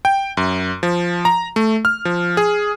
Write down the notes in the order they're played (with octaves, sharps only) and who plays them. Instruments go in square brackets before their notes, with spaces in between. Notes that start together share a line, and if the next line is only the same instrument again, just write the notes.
[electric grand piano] G5
F#2
F3
A#5
A3
F6
F3
G#4